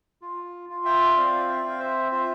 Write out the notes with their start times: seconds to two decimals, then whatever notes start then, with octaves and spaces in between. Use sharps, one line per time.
0.21 F4
0.69 F4
0.85 E5 G5
1.16 C4 D5 F5
1.48 E5 G5
1.64 C4 F5
1.80 C5 E5
2.11 F4 C5 E5